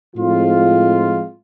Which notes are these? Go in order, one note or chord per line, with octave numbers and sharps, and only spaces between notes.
A2 F3 G#3 C4 F4